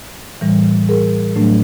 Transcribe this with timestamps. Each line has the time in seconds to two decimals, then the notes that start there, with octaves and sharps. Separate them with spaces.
0.41 A2 E3 G3
0.89 G#4 A#4
1.36 A2 F#3 A3 D4